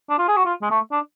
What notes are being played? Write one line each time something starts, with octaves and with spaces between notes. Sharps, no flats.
D4
F4
G#4
F#4
F4
G#3
A3
D4